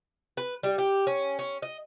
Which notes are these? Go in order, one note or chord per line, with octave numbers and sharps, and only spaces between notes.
B4
G3
G4
C#4
C#4
D#5